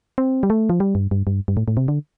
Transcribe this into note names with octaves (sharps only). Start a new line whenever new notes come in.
C4
G3
A3
F3
G3
G2
G2
G2
G2
A2
A2
C3
D3